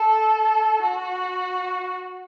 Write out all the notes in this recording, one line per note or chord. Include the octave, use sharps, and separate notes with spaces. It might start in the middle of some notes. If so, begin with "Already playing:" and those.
Already playing: A4
F#4